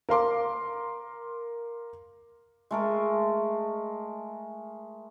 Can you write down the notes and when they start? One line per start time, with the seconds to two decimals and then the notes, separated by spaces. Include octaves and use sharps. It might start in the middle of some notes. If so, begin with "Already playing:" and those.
0.09 A#4 F5 C6 D6
2.71 G#3 A3 A#4